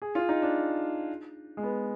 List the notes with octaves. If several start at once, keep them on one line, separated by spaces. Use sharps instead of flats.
G#4
F4
D#4
D4
G#3
B3